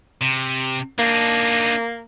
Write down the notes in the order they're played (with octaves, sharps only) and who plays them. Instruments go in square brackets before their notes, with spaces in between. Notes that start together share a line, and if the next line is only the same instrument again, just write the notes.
[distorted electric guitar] C3
[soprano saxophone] A#3 [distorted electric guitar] D4 D#4